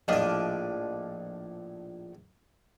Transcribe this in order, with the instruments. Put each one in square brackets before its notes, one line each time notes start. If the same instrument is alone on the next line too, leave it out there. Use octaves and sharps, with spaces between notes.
[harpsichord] A#1 A2 D5 [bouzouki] F3 D4 D#5